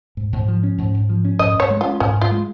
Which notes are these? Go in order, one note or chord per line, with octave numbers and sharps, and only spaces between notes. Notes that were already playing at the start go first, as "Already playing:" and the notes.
G#2
G#2
F3
C#4
G#2
G#2
F3
C#4
G#2 D#5
G#2 C#5
G#3
C#4 F4
G#2 C#4
G#2
F4
G#3